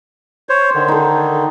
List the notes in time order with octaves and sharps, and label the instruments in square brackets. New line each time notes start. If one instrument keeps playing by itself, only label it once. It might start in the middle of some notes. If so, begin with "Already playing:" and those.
[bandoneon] C5 C#5
D3 D#3
[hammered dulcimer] D#4 A4